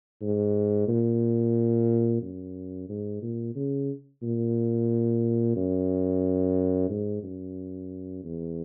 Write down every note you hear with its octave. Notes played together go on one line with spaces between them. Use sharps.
G#2
A#2
F#2
G#2
A#2
C#3
A#2
F#2
G#2
F#2
E2